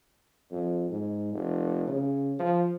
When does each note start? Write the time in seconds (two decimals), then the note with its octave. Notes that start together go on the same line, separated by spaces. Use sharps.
0.52 F2
0.90 G#2
1.33 F1
1.87 C#3
2.39 F3